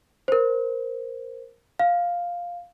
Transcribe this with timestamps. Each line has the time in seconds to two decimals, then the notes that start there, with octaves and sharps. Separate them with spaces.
0.28 A#4 C5
1.79 F5